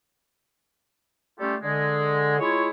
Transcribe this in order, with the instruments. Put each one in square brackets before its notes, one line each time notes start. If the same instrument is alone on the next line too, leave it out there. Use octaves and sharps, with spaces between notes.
[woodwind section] G3 A3 C#4 F4 G4 A4
D3 G#3
G#3 E4 F4 C#5